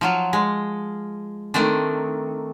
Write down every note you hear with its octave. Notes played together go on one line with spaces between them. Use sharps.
F3 F#3 F4
G#3
D#3 A3 C4 D4